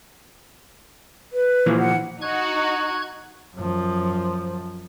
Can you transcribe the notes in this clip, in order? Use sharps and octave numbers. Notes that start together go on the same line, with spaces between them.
B4
A#2 E3 F3
F#5
D#4 F#4 C#6 F#6 G#6
F#2 F3